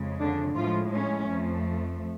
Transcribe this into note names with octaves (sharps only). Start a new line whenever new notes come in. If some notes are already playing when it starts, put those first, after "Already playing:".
Already playing: F2 C#3 G#3
D3 D4
A2 F3 G#3 F4
C#4
F2 F3 A3